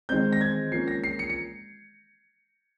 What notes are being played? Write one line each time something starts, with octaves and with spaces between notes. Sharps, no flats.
D#3 G#3 C4 G6
A#6
G#6
F3 A#3 C#4 C7
A#6
C7
C#7
C#7